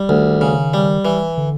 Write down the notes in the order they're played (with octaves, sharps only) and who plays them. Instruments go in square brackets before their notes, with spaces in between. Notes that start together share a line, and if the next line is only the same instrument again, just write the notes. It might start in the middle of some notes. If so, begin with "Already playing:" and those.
Already playing: [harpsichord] G3
[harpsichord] D2 [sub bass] D#3
[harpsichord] C#3
G3
E3
[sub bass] D3